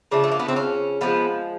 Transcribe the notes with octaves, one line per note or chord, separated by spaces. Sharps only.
C#3 F3 A3 D4
A3
A#3
B3
C4
C#4
D3 F3 G#3 B3